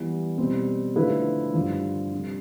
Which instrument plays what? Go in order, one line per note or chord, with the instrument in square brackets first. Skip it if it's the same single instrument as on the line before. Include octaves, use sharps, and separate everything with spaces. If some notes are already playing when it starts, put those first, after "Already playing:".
Already playing: [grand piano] E3 G3 B3
B2 G3 C4
D3 F3 A3 E4 B4
G2 D3 F3
C3 G3 D4